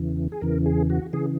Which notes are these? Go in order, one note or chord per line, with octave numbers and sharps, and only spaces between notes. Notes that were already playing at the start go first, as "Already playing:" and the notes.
Already playing: E2 C#3 E3
G#4
E2 C#3 E3 A#4
G#4
F#4
C#3 E3 G#4